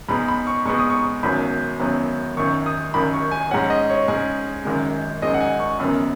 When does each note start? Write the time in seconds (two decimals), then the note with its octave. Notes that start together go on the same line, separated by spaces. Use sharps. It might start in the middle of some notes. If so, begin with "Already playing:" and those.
0.09 G#2 G#3 B3 B5
0.28 B5
0.47 C#6
0.66 G#2 G#3 B3 C#6
0.78 D#6
0.90 C#6
1.23 G#1 F#2 F#3 B3 B5
1.79 G#1 F#2 F#3 B3
2.37 G#1 F#2 D#3 C#6
2.66 D#6
2.94 G#1 F#2 D#3 B5
3.13 C#6
3.31 G#5
3.51 G#2 G#3 C#4 F#5
3.70 D#5
3.90 C#5
4.08 G#2 G#3 C#4 G#4
4.65 G#1 F#2 D#3 G#3
5.22 G#1 F#2 D#3 G#3 D#5
5.34 F#5
5.41 G#5
5.60 C#6
5.79 F#1 F#2 D#3 B3